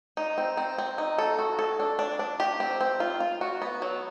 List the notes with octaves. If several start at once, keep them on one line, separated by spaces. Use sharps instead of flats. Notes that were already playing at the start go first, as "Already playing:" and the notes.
D#4
C4
C4
C4
D#4
A4
F#4
A4
D4
D4
D4
G4
C4
C4
F4
F4
F#4
B3
F#3